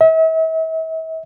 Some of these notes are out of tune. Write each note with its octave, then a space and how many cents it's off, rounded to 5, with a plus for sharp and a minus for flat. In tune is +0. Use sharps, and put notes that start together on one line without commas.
E5 -40